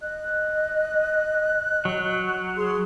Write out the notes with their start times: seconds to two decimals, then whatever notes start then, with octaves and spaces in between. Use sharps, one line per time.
0.02 D#5 F#6
1.85 F#3
2.57 G#4 C6